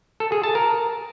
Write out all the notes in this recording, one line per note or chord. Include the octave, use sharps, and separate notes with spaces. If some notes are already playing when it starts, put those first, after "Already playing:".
A4
G#4
A5
A#4